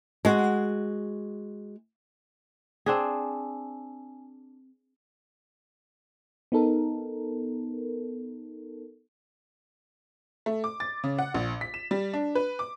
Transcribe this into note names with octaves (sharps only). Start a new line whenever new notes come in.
G#3 F#4
C4 D4 G#4
B3 D#4 A4 A#4
A3
D6
A6
C#3
F#5
A#1
B6
E7
G3
D4
B4
D6